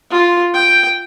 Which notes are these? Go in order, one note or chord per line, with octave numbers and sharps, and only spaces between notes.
F4
G5